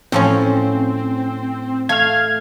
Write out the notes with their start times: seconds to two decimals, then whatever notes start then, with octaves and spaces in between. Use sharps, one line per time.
0.12 A2 F3 C4 C#4
1.89 A3 F5 F6 G#6